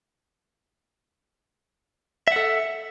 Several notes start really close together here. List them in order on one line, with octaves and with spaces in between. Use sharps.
E5 F#5 A4